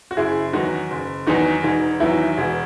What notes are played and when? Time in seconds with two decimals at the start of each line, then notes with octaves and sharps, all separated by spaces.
0.11 F#4
0.17 F#1 E4 G#4
0.53 E2 D#3 F#3 D#4 F#4
0.91 F#1
1.27 E2 D#3 F#3 D#4 F#4
1.63 E1 D#4
2.00 E2 D#3 F#3 E4
2.37 E1